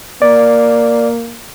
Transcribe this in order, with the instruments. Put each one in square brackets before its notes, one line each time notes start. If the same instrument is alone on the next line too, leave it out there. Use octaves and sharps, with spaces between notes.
[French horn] A#3 [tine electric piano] D5